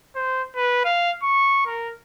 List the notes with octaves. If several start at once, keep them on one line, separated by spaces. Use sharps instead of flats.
C5
B4
F5
C#6
A#4